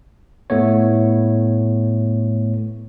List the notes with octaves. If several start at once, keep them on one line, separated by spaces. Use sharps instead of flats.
A2 A3 B3 C#5